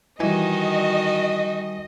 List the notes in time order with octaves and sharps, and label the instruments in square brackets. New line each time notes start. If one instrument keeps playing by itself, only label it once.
[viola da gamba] D#3 F#4 [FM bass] E3 [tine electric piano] G3 G#5 [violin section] D#5